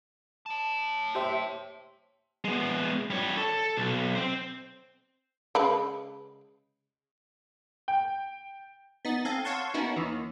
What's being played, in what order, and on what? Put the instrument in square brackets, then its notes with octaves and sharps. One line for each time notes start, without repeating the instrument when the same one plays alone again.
[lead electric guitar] C#5 A5
[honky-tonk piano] G4 C5 E5
[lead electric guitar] G#3 B3
G3 C#5
A4
B1
C4 C5
[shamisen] C#3 G#3 B4
[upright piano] G5
[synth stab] B3 D#4 D#6 A6
C4 A4 F5 G#5
C#5 F5 F#5 A5 C6 C#6
A#3 B3 C#4 D#4 E4 F#4
D#2 D#3 E3